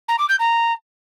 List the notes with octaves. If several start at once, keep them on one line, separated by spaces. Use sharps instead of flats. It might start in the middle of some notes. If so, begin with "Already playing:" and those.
A#5
D6
G6
A#5